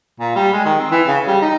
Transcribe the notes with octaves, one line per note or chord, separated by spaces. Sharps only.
A#2
G3
G#3
D#3
C4
E3
C#3
G3
D#4